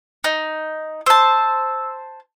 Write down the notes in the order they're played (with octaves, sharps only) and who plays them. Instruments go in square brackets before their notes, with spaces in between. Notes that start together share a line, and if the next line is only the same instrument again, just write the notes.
[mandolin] D#4
[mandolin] C5 A5 [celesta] E6